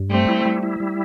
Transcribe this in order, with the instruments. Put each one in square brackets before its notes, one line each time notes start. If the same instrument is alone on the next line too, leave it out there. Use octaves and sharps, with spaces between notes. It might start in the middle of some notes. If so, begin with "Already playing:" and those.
Already playing: [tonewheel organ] G2
[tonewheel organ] G3 [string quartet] A3 C4
[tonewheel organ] E4
G3
E4
G3